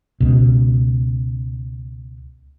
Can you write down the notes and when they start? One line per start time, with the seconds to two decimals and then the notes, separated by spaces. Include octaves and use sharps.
0.20 C#2 B2